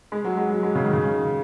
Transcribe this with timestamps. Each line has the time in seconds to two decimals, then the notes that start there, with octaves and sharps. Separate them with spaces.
0.12 G#3
0.25 F#3
0.37 G#3
0.50 F#3
0.63 G#3
0.75 C#3
0.84 D#3
0.93 C#3